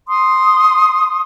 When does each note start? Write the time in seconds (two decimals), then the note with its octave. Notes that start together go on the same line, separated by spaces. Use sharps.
0.08 C6 D#6